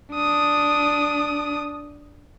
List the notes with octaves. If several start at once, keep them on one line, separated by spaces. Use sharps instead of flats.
D4 D#6